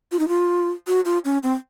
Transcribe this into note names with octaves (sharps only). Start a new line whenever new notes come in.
F4
D#4
F4
F#4
F4
C#4
C4